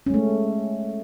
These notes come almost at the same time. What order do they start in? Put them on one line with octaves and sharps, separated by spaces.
C#4 G#3 A3